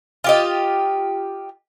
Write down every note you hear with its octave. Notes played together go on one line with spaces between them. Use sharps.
F4 G4 D#5